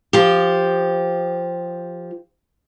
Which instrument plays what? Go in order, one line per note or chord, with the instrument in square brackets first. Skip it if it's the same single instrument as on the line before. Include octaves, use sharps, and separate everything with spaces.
[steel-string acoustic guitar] F3 G4